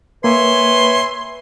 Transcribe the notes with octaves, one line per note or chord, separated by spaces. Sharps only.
A#3 B4 C#5 E5 G#5 C6